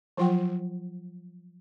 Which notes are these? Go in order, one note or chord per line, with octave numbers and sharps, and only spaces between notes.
F3 F#3 F4 F#5 G5